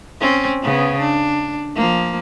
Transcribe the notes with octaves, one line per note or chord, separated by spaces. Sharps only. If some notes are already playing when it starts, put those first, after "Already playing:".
C4 C#4
C#3 B3
D4
F3 A#3